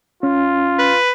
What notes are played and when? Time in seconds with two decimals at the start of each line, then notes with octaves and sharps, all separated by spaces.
0.23 C#4 F4
0.79 B4